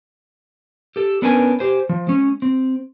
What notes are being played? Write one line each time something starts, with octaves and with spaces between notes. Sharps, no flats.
G4 A4
B3 C#4 D4 A#4 B4 G#5
G4 C5 G#5
F3
G#3 C#4
C4